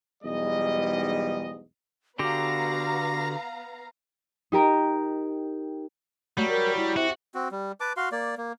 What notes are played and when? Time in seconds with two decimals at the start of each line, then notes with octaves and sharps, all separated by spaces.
0.24 B1 E2 G#2 G3 D#5
2.19 D3 B3 F#4 G4 F5 A#5 A#6
4.52 D#4 G4 A#4 A#5
6.37 F#3 G3 A3
6.49 A#4
6.77 E4
6.97 C3 F#4
7.34 C4 F#4
7.51 G3
7.80 B4 A5 D6
7.97 F#4 F5 C6
8.12 A#3 D5
8.38 A#3